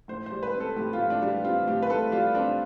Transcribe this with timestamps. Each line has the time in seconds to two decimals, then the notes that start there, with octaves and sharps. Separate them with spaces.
0.08 A2 C5
0.26 C5
0.32 G3
0.43 B4
0.54 C4
0.60 A4
0.76 A2 G4
0.93 F4
0.99 A2
1.10 D4
1.22 G3
1.28 G4
1.45 C4 F4
1.67 A2 G4
1.82 B4
1.89 A2 A4
2.12 G3 F4
2.35 C4 D4